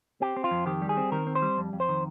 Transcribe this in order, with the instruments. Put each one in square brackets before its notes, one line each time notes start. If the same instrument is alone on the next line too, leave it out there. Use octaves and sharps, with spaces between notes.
[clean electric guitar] C4 G4
C4
F4
F2
D#3 G4
G3
G#4
C4
D#3 A#4
C4
C5
G3
F2
F2
C5
D#3